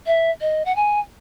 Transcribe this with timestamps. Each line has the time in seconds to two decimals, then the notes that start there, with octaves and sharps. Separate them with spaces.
0.06 E5
0.41 D#5
0.65 F#5
0.76 G#5